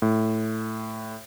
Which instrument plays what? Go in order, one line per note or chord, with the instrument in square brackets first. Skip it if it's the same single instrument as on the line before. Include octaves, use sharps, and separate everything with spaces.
[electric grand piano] A2